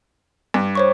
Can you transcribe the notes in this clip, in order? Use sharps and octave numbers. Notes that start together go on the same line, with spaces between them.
G2
C5 C#5 C#6